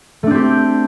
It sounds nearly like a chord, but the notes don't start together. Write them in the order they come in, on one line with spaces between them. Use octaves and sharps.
A3 D4 C4 G4